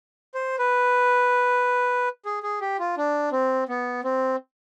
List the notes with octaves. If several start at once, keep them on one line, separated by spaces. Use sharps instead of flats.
C5
B4
G#4
G#4
G4
F4
D4
C4
B3
C4